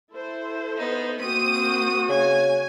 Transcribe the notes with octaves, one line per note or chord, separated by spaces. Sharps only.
E4 A4 C5
B3 D#4
A#3 C4 F#4 C5 D#6 D#7
C#3 G#5